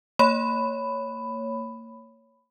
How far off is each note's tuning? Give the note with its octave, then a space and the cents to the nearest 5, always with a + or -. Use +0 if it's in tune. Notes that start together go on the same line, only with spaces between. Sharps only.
A#3 -30 C#5 +0 B5 +10